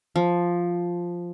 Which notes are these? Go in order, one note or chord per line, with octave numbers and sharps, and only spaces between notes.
F3